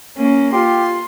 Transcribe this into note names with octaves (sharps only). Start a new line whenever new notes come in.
A#3 C#4
F4 G4 C6